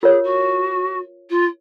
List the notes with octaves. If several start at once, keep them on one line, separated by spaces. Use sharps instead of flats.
F4 G#4 A#4 C#5
F#4
F4